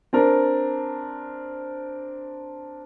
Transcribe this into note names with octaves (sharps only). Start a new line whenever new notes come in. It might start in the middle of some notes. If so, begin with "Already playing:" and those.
C4 D4 A#4